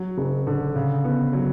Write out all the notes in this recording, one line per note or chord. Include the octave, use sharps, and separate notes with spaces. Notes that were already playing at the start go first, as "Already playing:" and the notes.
Already playing: F#3
F#1
D3
C#3
B3
F#3